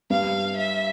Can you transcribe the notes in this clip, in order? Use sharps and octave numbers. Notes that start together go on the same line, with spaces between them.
G2 F5
E5